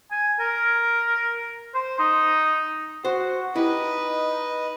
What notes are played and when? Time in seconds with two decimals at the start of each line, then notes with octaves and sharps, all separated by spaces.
0.12 G#5
0.40 A#4
1.74 C5
1.99 D#4
3.05 F#4 C5
3.56 D#4 E4 G4 B4 D#5